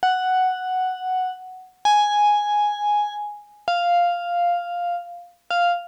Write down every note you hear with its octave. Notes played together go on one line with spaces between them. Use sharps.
F#5
G#5
F5
F5